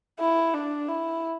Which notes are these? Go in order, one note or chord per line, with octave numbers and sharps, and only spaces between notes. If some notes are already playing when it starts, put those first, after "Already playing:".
E4
D4
E4